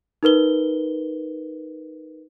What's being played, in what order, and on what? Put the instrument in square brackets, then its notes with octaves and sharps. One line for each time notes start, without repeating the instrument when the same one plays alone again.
[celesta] D#4 A#4 B4 G7